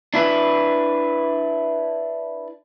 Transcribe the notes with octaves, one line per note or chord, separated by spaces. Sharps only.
D4 E4 B4